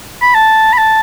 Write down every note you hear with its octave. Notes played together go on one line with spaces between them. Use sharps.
B5
A5
B5
A5